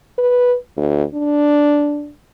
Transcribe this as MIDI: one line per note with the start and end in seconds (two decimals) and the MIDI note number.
0.18 0.55 71
0.77 1.04 38
1.14 2.11 62